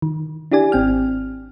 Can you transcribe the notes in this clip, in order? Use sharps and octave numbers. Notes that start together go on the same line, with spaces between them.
D#3
D4 E4 G4 D5 G#5
G#1 C4 G5 F6